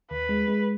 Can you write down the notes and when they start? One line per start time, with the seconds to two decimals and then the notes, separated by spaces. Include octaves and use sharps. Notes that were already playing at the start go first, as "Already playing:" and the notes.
0.11 D#2 B4
0.29 G#3
0.48 G#3